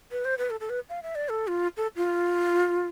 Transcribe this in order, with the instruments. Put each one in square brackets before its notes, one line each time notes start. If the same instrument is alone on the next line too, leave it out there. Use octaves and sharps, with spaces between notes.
[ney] B4
C5
B4
A4
A4
B4
F5
E5
D5
A4
F4
A4
F4